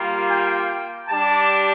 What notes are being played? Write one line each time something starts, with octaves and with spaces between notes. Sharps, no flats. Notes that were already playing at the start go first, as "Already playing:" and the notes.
Already playing: G3 A#3 F4
G5
G3 D4 G4 A5